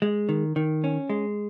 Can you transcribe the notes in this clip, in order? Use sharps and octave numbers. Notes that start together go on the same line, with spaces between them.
G#3
D#3
D#3
C#4
G#3